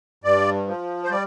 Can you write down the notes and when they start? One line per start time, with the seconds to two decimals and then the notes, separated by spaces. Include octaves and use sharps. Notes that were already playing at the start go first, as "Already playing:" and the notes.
0.24 G2 D5
0.67 F3
1.04 C5
1.10 G3 D5